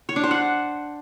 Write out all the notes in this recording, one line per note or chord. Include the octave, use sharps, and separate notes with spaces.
C#5
D4
C5
F#5